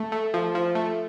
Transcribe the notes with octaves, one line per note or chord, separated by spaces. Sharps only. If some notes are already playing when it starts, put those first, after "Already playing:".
Already playing: A3
A3
F3
F3
A3